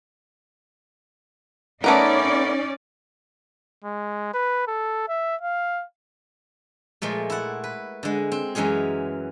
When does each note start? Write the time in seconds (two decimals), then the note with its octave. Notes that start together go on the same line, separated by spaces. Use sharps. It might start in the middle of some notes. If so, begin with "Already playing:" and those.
1.84 A3 B3 C#4 D#4 A#4 D5
3.84 G#3
4.34 B4
4.67 A4
5.09 E5
5.41 F5
7.02 A#2 F3 G#3 A3
7.30 E4 F#5
7.64 B4
8.03 D3 G#3
8.32 C4
8.55 F#2 E3 G#3 C#4 G#4